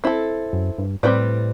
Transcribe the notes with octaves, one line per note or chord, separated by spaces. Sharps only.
C4 E4 A4
F#2
G2
A2 G3 C4 F#4 B4 D5